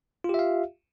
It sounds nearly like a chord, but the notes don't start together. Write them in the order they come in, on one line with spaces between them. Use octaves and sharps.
F4 G4 E5 F5